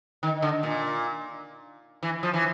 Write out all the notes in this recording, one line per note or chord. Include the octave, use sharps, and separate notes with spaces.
D#3
D3
A#2
E3
F3
E3